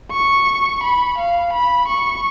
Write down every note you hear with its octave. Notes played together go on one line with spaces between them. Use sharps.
C#6
B5
F5
B5
C#6